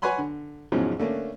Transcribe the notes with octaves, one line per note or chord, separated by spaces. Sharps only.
B4 C#5 F#5 G#5 B5 C6
D3
E2 G#2 C#3 F3 F#3 G#3
D3 A3 A#3 C#4 D4